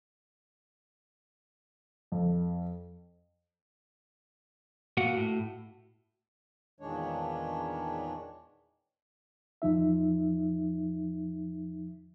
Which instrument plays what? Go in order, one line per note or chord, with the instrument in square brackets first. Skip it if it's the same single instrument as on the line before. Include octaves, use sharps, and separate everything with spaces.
[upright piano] F2
[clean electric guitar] A#2 A#3 F#5 [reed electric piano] F#4
[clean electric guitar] A2
[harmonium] E2 A#2 D#3 G#3 D4 C#5
[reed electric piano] E2 F3 D#4 E5